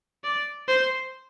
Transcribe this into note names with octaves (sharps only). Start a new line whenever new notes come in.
D5
C5